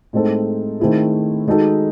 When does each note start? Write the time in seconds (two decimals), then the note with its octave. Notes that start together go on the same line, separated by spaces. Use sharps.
0.13 A2 G#3 C4 D#4 A4
0.80 D#3 A3 C4 E4 G#4
1.47 D#3 G#3 D#4 F#4 A4